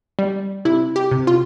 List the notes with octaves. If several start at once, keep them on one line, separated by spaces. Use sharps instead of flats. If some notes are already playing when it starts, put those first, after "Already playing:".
G3
C3 E4
G4
C3
F4